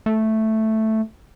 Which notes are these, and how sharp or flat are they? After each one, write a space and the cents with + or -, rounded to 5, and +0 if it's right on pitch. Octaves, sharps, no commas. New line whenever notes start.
A3 +0